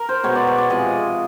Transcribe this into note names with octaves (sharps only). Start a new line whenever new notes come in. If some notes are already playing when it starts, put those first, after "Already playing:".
Already playing: A#4
C5
B2 G#3 B3 C#5
D5
C#5
D5
C3 F3 G#3 D#5